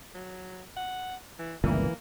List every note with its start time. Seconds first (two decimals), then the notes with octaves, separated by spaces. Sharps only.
0.15 F#3
0.77 F#5
1.39 E3
1.64 G1 C#2 A#2 E3 A#3